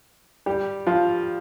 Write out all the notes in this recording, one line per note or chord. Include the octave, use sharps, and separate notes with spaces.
G3 G4
F3 F4